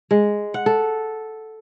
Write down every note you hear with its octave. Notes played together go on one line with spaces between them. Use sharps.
G#3
F#5
A4